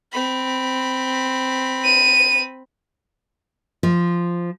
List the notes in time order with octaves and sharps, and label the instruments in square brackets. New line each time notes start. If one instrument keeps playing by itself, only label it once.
[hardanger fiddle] C4 B5
[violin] D#7
[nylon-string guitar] F3